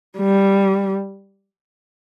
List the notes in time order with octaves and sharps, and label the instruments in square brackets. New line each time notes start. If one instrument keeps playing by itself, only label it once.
[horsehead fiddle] G3